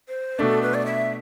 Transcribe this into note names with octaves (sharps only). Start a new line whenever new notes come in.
C5
B2 A3 D4 A4
B4
D5
E5